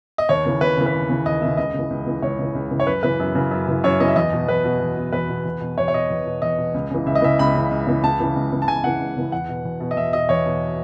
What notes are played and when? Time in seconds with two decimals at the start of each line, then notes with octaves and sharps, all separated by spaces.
0.18 D#5
0.29 D#2 C#5
0.45 C#3 E3
0.61 D#2 B4
0.77 C#3 E3
0.86 B4
0.94 D#2
1.09 C#3 E3
1.26 D#2 D#5
1.42 C#3 E3 E5
1.57 C#2 D#5
1.73 C#3
1.79 E3
1.90 C#2
2.06 C#3 E3
2.22 C#2 C#5
2.39 C#3 E3
2.55 C#2
2.71 C#3 E3
2.80 C#5
2.87 F#2 B4
3.03 C#3 E3 B4
3.20 F#2
3.35 C#3 E3
3.51 F#2
3.68 C#3 E3
3.84 F#2 C#5
4.00 C#3 E3 D#5
4.08 E5
4.16 E2 D#5
4.33 B2
4.48 E2 B4
4.64 B2
4.80 E2
4.97 B2
5.12 E2 B4
5.29 B2
5.46 E2
5.61 B2
5.78 E2 C#5
5.88 C#5
5.93 B2 D#5
6.10 E2
6.26 B2
6.42 E2 D#5
6.58 B2
6.74 C#2
6.91 C#3 E3
7.06 C#2 E5
7.15 D#5
7.22 C#3 E3 E5
7.39 C#2 B5
7.54 C#3 E3
7.71 C#2
7.87 C#3 E3
8.03 C#2 A5
8.20 C#3 E3
8.36 C#2
8.52 C#3 E3
8.62 A5
8.67 C#2 G#5
8.83 C#3 E3 F#5
9.00 C#2
9.16 C#3 E3
9.32 E2 F#5
9.49 B2
9.65 E2
9.80 B2
9.91 D#5
9.97 E2 E5
10.13 B2 D#5
10.29 E2 C#5
10.46 B2